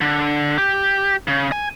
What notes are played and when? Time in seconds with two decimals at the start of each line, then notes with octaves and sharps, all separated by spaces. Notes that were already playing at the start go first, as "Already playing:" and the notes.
0.01 D3
0.58 G4
1.28 C#3
1.52 G#5